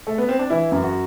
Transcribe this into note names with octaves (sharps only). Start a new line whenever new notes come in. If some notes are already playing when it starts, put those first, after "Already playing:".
A3
B3
C4
D4
E3 E4
F#2
F#4